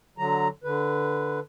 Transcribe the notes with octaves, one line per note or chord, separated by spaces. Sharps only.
D3 F#3 A#5
D3 B4